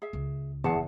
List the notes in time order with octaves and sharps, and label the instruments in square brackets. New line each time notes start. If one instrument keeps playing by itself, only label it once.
[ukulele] G#4 E5
[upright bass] C#2
[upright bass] F#1 F3 [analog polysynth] E2 [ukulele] G#4 F#5 A5